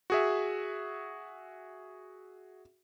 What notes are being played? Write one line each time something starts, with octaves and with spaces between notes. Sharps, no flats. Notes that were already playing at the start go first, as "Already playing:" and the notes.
F#4 G#4 E5